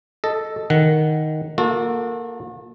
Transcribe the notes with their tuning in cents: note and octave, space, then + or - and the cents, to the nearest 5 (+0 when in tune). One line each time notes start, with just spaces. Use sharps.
A4 +0 D#5 +0
D#3 +0 F#5 +0
A#3 +0 F#4 -40 A4 +0